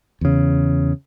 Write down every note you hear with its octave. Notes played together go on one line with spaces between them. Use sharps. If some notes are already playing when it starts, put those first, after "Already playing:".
E2 C#3